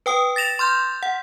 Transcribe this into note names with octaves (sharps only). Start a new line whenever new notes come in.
B4 G5 D#6
A6 A#6 E7 F7
C6 F6 G6
F#5